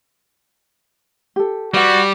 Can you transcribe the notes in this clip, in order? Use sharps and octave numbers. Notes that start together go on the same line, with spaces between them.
G4 A4
G3 F#4 B4 F#5